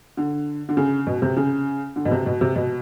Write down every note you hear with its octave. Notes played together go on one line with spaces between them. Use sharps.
D3
D3
C#3
B2
C3
C#3
D3
B2
C3
B2
C3
B2